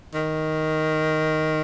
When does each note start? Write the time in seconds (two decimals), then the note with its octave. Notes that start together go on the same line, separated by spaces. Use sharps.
0.14 D#3